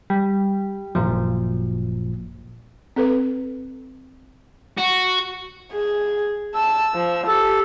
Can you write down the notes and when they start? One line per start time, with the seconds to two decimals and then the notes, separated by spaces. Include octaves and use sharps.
0.10 G3
0.95 G#1 F#2 A#2 F3
2.96 C4 A4 B4
4.78 F#4
5.73 G#4
6.54 A5 E6
6.94 F3
7.27 G4 A4